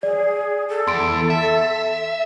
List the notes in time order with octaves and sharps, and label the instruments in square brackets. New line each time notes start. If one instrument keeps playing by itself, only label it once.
[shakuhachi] G#4 [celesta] D5
[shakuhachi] A4
[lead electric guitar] E2 [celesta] C6 D7
[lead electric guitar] E5